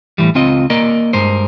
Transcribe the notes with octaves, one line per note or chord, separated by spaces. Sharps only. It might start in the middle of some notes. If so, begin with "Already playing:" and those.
A2 E3 G3
C#2 C4 F4 D#5
A#3 A#4 D5 D#5
G2 G#3 A#4 C5